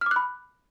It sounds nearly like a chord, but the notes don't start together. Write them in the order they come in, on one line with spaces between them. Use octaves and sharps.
F6 D6 F#6 B5